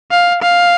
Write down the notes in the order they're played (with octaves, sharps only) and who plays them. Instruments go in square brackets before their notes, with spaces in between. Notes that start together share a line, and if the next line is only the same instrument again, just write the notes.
[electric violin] F5
F5